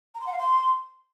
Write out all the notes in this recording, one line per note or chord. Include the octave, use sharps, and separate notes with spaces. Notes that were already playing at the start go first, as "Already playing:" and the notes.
A#5
C6
F#5
F5
C6